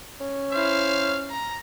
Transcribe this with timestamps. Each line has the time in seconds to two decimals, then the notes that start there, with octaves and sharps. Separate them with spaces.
0.20 C#4
0.52 E4 C5 F5
1.30 A#5